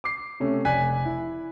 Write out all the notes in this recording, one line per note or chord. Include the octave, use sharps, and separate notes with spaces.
D6 C7
C3 A3 C#4
F1 D5 G#5 F#6 B6
E4